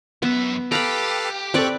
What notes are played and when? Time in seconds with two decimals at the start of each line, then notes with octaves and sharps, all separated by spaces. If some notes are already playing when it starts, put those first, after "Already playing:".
0.22 F#2 B3 E5
0.72 G4 A4 B4 F5 A#5 B5
1.54 C4 A4 B4 D5 C#6 F#6